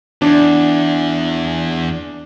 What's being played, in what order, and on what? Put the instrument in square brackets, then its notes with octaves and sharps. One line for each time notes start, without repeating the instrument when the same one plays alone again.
[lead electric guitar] E2 [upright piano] D4